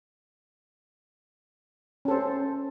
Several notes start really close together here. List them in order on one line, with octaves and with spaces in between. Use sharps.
C#4 A4 C5